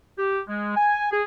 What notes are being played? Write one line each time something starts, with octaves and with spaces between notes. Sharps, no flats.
G4
G#3
G#5
G#4